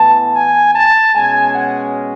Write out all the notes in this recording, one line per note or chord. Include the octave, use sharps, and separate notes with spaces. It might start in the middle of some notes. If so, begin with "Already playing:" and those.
Already playing: A2 E3 B3 A5
G#5
A5
B2 G#3 C#4 G#5
F#5